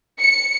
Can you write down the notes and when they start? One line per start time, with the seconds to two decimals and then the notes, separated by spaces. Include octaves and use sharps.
0.19 C#7